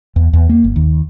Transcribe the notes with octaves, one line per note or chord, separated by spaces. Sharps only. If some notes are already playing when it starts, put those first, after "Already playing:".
E2
E2
A#3
G1
D#2